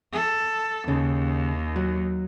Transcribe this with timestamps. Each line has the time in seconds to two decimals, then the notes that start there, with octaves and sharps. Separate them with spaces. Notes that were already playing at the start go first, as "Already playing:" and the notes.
0.13 A4
0.88 D#2 C#3
1.76 F#3